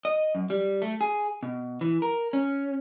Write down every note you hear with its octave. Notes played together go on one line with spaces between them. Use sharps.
D#5
F#2
G3
A3
G#4
B2
E3
A#4
C#4